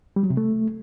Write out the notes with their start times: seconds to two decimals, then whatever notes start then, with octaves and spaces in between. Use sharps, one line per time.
0.16 G3
0.23 F#3
0.30 C3
0.37 A3